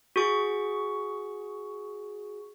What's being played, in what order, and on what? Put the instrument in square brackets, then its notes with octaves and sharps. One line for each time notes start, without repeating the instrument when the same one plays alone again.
[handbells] F#4 G#4 C#6